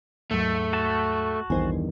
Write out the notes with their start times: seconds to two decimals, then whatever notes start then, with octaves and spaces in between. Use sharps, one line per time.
0.31 D#2 G#2 F#3 A3
0.73 F#4 A5
1.50 A#1 E2 G2 D#3 C5 G#5